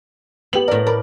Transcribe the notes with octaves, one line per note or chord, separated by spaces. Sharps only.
B3 G4 F#7
A2 A#4 D5
A#4 D5 B5